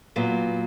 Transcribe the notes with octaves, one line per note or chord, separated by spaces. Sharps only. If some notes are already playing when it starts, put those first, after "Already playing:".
A#2 F#3 B3